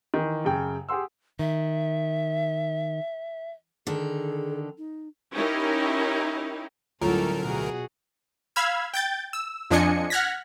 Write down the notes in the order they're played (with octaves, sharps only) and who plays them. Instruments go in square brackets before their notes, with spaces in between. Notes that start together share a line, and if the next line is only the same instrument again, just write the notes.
[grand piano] D#3 E3
F#2 C#3 G5
G4 G#4 F#5 C6 E6
[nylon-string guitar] D#3 [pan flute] E5
[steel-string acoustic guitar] D3 D#3 A4 [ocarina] G#4
[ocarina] D#4
[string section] C#4 D#4 E4 G4 A#4
[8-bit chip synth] D2 A#4 [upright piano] A2 F#3 [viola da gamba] G3 C#4 A4 [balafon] F4
[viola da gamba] B2 F#4 G#4
[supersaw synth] F5 B5 E6 F6 G#6
G5 G6 A6
E6
F2 F3 D4 D#5 G#5 C#7
F#5 F6 F#6 G#6 A#6 B6